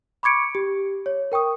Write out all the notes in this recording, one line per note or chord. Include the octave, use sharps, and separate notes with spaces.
B5 C#6 D6 G#6 C#7 D7
G4
C#5
A#4 G5 C#6 D#6